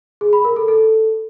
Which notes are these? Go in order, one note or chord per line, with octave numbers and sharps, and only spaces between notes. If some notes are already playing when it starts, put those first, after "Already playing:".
G#4
B5
A#4
A4
A4